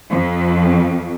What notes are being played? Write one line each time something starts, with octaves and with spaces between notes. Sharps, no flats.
F2